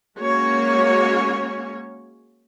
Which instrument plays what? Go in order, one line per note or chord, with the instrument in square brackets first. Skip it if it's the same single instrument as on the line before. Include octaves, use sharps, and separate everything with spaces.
[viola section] G#3 A#3 C#4 F#4 C#5